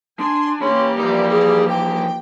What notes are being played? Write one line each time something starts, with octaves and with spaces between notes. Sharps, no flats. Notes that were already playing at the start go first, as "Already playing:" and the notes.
D4 G#5 C6
E3 A#3 C#4 G4 B5 C6
D#3 F3 G3 D5
G#4
G5